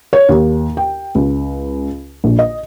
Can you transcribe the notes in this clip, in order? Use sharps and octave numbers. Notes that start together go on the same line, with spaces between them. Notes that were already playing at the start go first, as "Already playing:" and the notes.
C#5
D#2
G5
C#2
A#1
D#5